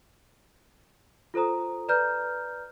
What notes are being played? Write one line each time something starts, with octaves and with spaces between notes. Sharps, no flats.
F4 A4 C5 A#5 D#6
B4 D5 A#5 F6 G6